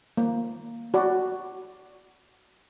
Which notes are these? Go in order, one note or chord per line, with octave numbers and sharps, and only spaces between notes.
A#3
F#4 D5